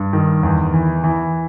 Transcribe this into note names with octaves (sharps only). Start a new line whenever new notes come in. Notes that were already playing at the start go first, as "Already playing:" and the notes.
Already playing: G2
D#3
E2
E3
E3